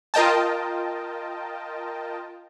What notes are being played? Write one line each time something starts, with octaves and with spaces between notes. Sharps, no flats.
F4 A#4 D#5 G5 A5